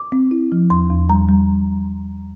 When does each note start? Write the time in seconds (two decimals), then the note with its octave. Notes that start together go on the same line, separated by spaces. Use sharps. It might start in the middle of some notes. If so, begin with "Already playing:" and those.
Already playing: D6
0.12 C4
0.31 E4
0.52 F3
0.70 E2 C6
0.90 E2
1.09 G3 A#5
1.29 G3